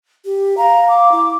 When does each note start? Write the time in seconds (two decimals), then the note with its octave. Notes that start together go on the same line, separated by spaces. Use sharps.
0.25 G4
0.58 F5 A#5
0.89 D6
1.12 E4